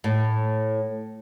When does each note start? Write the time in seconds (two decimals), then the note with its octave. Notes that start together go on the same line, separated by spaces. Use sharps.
0.04 A2